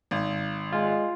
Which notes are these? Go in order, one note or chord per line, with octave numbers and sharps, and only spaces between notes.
G#1
G#3 F4